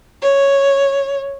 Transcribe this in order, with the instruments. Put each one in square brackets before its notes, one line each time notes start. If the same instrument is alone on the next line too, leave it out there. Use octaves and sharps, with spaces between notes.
[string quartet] C#5